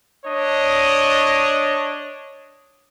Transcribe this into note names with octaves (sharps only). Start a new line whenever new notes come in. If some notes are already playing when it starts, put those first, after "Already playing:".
D4 C#5 D#5